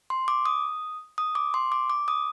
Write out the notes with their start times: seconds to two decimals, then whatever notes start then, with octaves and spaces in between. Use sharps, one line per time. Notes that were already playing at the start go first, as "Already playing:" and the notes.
0.10 C6
0.28 D6
0.46 D#6
1.18 D#6
1.35 D6
1.54 C6
1.72 D6
1.90 D6
2.08 D#6